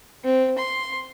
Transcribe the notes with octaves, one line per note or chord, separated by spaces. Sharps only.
C4
C6